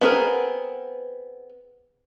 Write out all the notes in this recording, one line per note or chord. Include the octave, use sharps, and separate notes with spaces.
B3 C4 D4 G#4 A#4